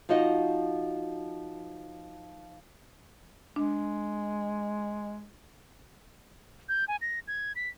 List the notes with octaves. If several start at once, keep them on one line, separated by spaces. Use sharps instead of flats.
F3 D#4 F#4 D#5
G#3 D4
G6
G#5
A#6
G#6
B6